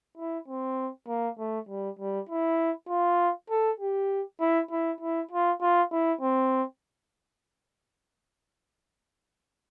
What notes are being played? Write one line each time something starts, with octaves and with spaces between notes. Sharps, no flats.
E4
C4
A#3
A3
G3
G3
E4
F4
A4
G4
E4
E4
E4
F4
F4
E4
C4